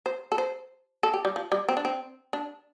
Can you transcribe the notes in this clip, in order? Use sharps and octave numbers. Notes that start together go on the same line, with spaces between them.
C5
A4
C5
A4
G4
G3
F3
G3
C4
D4
C4
D4